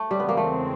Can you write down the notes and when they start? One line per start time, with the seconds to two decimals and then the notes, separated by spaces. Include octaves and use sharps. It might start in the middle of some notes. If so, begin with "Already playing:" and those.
Already playing: A3
0.10 E2 C#3 E3 G3 G#3 C4
0.20 B3
0.29 A#3
0.37 A3